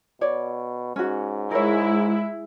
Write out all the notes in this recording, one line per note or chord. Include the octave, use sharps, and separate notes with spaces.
B2 C#5 D5
G#2 C#4 F#4
G#3 E4 A#4 C#5